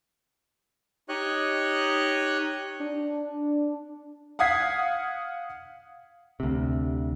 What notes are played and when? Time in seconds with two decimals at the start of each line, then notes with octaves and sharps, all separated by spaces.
1.09 D#4 G4 C#5 D#5 C#6 F#6
2.80 D4
4.39 F5 F#5 D#6 G#6 B6 C7
6.40 D2 C3